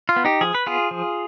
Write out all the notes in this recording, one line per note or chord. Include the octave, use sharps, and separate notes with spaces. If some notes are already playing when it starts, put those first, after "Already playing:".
F4
B3
D#4 G4
F3 G#4
B4
B3 F4 G#4
F3